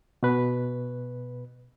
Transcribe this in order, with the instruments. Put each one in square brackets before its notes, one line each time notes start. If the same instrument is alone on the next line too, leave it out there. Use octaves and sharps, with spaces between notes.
[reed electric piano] B2 B4